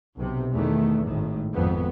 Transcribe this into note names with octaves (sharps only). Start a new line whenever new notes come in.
B1 C3
E2 D#3 A3
G#1 A2 D#3
G#1 F2 B3